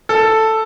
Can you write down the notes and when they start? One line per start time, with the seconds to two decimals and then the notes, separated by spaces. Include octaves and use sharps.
0.09 A4